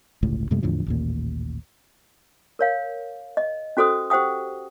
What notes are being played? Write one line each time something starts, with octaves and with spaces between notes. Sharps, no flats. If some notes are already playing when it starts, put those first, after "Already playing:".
G1 C#2 A2
F#2 C3 G#3 A3
E2 A2 D3 F3
A1 D#2 A#2
A#4 C#5 F5
D#5
C#4 F#4 A4 C5 D#6
G4 C5 F#5 G5 D#6